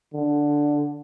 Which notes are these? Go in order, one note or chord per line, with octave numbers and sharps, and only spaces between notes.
D3